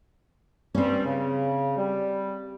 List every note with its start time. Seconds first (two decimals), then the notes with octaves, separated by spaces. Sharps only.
0.75 G2 G3 C4 C#4
1.05 C#3
1.77 G3